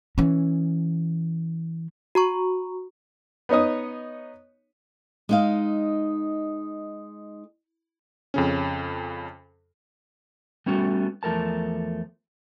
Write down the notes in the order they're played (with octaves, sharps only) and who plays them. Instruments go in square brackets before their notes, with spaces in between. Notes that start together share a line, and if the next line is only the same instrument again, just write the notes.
[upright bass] E3 C#4
[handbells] F#4 A#5 C#6
[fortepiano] B3 D#4 C#5 D#5 D#6
[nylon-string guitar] G#3 D#4 F5
[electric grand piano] F2 C#3 C#4
[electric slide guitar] G3 A3 B3 C#4 F#4
E2 F3 A3 A#4 A5